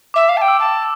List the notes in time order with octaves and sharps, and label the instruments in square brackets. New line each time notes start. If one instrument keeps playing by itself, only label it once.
[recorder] E5 [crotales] D6
[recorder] F5
A5
G5
[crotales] E6
[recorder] A5